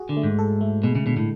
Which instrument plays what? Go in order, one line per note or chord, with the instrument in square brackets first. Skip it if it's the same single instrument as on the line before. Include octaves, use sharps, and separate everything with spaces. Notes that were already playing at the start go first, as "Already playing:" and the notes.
Already playing: [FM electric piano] F#4 G#4
[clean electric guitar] D3
[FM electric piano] A3
[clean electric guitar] G#2
[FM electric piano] A4
A3
[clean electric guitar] B2 [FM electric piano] G#3
[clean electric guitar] C#3
[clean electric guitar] B2 [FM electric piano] D3
[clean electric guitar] A2